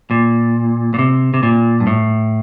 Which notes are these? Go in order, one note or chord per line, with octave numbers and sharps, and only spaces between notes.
A#2
A#2
C3
C3
A#2
G2
A2